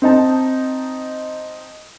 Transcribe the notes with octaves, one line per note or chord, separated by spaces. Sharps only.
C4 D#4 A5